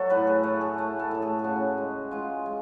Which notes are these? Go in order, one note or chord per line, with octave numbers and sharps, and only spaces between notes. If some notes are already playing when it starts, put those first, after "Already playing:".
Already playing: F#3 F#4 A4
A2 B4
G#4
A3 A4
G#4
A3
A4
A2 A4
G#4
G#4
C#3 F#4
G#3
G#3 F4
G#3